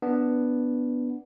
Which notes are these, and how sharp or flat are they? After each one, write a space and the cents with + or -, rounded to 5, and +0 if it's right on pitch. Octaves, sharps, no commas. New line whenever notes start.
B3 +0 D4 +0